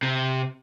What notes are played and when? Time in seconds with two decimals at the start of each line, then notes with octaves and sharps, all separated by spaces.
0.03 C3